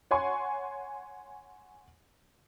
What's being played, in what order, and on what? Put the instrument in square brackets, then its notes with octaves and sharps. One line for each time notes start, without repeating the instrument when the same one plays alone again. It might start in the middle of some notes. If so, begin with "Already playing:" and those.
[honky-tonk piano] C#5 F#5 G#5 C6 C#6